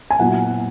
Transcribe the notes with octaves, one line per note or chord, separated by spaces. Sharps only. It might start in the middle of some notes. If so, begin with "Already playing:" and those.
G#5
A#2 F#3 B3 E4 F#5